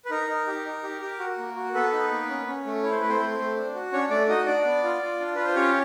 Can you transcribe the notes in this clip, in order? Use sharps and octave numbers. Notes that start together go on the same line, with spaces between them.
B4
D#4 A#4
D#4
G4
D#4
G4
G4
F#4
A#3
F#4
B3 A4 B4
D#4
A#3
C#4
C#4
A3
E4 C#5
C5
A3 B4
C4 C5
A3
A3
D4
F#4
C#4 D4 C#5
A3 D4 D5
D#4 F#4 D#5
D4 D5
B3
F4
F4
D4
F4 B4
C5
C#4 G4 C#5